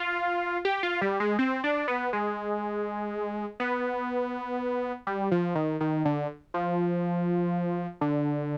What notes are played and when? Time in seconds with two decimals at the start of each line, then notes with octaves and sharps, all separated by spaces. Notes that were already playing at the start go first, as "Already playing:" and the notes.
Already playing: F4
0.65 G4
0.83 F4
1.01 G3
1.20 G#3
1.39 C4
1.64 D4
1.88 B3
2.13 G#3
3.60 B3
5.07 G3
5.32 F3
5.55 D#3
5.81 D#3
6.05 D3
6.54 F3
8.01 D3